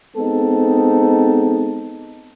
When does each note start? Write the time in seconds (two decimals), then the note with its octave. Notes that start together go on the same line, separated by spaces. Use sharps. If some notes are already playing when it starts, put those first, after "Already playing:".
0.17 G#3 B3 C4 D#4 A4